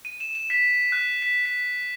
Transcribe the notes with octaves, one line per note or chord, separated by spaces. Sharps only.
D#7
E7
E7
B6
F#6
B6
B6